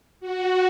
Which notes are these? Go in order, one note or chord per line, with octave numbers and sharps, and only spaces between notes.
F#4